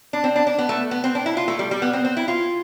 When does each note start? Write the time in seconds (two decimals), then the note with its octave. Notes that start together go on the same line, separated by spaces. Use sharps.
0.13 D4
0.24 C4
0.36 D4
0.47 D4
0.59 B3
0.69 A3
0.91 B3
1.04 C4
1.15 D4
1.26 E4
1.37 F4
1.48 A3
1.59 G3
1.71 G3
1.82 B3
1.93 C4
2.05 C4
2.17 E4
2.28 F4